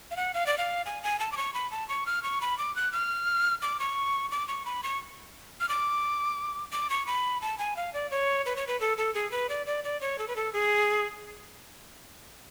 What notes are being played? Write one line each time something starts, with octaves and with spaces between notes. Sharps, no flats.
F5
F#5
F5
D5
F5
G#5
G#5
A5
D6
C#6
B5
A5
C#6
F6
C#6
B5
D6
F#6
F6
D6
C#6
D6
C#6
B5
C#6
F6
D6
D6
C#6
B5
A5
G#5
F5
D5
C#5
B4
C#5
B4
A4
A4
G#4
B4
D5
D5
D5
C#5
A4
B4
A4
G#4